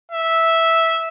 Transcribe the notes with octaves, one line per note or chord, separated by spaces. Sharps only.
E5